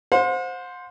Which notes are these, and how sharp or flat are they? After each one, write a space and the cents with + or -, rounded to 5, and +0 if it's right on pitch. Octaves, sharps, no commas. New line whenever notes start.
C5 +0 F#5 -45